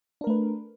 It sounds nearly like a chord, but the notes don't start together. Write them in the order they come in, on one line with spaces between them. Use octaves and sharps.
D4 A#4 A3 B4